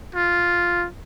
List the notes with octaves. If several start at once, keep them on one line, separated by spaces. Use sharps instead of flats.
F4